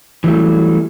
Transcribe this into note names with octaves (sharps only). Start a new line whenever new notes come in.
E3 F#3 G3 A3